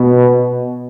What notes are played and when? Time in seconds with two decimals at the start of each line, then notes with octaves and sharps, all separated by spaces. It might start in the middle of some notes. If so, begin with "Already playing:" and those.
Already playing: B2